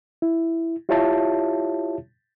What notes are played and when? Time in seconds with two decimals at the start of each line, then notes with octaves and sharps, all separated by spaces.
0.22 E4
0.89 E4 F4 G4 C#5 E5 A5